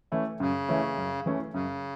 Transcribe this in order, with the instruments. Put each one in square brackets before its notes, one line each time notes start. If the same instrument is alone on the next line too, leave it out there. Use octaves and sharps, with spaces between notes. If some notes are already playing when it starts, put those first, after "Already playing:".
[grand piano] E3 A3 C#4 E4
[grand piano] F#2 [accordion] C#3
[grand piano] E3 A3 C#4 E4
F#2
E3 A3 C#4 E4
[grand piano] F#2 [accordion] C#3